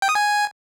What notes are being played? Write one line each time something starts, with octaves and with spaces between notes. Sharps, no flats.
G5
D#6
G#5